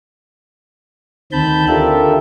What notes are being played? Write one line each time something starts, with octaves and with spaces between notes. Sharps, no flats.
D2 D#3 C4 A5 B5 G6
D4 F4 G4 A4 A#4 E5